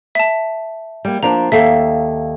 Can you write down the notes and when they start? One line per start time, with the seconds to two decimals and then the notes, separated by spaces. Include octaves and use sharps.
0.15 E5 A5
1.05 G3 A#3
1.23 F3 A#3 D4 A#5
1.52 D#2 A4 E5 F5